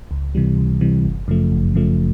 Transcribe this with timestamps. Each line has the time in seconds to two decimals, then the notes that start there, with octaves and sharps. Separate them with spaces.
0.11 C#2
0.35 C3 E3 G3
0.57 C#2
0.81 C3 E3 G3
1.04 G1
1.28 F#2 C#3 F3 A3
1.52 G1
1.75 F#2 C#3 F3 A3